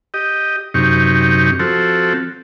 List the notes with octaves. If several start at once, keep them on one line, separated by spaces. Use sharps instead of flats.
G4 D#5
F#2 C3 D#4 G4 C#6
F3 C4 F#4 A4